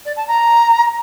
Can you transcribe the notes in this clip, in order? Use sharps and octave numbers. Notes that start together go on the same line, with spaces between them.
D5
A5
A#5